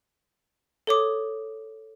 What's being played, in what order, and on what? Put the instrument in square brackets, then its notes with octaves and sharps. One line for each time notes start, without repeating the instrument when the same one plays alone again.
[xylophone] A4 C#5 D6 D#6